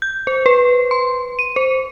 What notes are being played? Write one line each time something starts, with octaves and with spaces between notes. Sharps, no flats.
G6
C5
B4
C6
D#7
C5